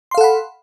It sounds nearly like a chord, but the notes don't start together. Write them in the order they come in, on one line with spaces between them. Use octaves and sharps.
C6 F5 A4 F#5 B5